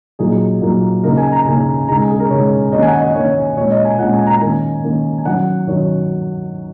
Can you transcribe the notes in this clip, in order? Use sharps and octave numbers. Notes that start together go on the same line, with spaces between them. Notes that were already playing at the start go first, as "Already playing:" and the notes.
A#2 F#3 A#3 D#4 G#4
A#2 F#3 A#3 D#4
C#3 A#3 D#4 A#4
G#5
A#5
C#3 A#3 D#4 G#5
C#3 G#3 D#4 A#5
G#5
G#4
A#4
C#3 G#3 D#4 C#5
D#3 A#3 C#4 D#5
G#5
F#5
D#5
D#3 A#3 C#4 C#5
A#2 G#3 C#4 C#5
D#5
G#5
A#2 G#3 C#4 F#5
G#5
A#5
D#3 A#3 C#4 G#5
D#3 A#3 C#4
G#5
D#3 F#3 C#4 F#5
D#3 F#3 C#4 C#5